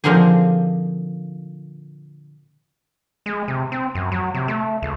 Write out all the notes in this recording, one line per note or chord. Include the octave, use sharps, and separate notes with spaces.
A#2 D3 F3 C4 D#4 G#4
G#3
C3
C4
F#2
F#3
C3
A3
C#2